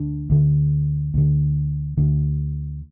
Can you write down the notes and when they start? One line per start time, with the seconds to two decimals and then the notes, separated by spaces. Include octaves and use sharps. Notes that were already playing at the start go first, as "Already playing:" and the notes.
Already playing: D2 D3 D4
0.30 D2 D3
1.14 D2 D3
1.97 D2 D3